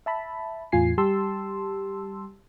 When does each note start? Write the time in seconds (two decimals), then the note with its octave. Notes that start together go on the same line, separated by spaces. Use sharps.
0.06 E5 A5 B5
0.72 E2 A2 F4 G#5 C7
0.98 G3 G4 A5 C6 E6